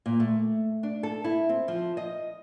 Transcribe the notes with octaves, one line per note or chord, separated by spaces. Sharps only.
A#2
A3
D4
A4
E4
C4
F3
D#5